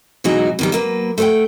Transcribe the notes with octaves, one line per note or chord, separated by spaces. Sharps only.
B2 E3 F#3 G#3 D#4 F#4
B2 D#3 G3
F#3 A#3 B4
A3 B4 C5 F#5 G5